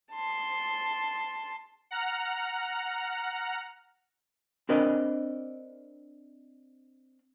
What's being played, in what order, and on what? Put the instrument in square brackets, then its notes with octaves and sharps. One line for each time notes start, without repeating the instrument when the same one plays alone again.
[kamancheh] A5 C6
[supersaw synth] F#5 A#5 F6
[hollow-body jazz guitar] C4 D4 A#4 B4 D#5